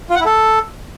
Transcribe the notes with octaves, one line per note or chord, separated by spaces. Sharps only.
F4
F#5
E4
A4